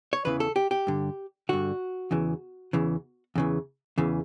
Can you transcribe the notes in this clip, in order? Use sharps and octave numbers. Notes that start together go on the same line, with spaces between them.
C#5
E2 C#3 E3 B4
A4
G4
G4
G2 D3
G2 D3 F#4
E2 C#3 E3
E2 C#3 E3
E2 C#3 E3
E2 C#3 E3